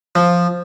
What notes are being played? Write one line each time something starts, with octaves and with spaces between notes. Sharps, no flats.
F3